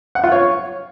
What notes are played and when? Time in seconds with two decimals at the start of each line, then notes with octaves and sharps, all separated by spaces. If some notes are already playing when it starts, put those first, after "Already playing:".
0.15 F#5
0.24 F4
0.32 C#5